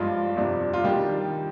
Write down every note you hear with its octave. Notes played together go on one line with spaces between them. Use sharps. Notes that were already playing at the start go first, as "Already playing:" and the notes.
Already playing: G2 F3 G#3 D4 F4
F2 C3 G3 D4
F4
D#3 G3 D4 G4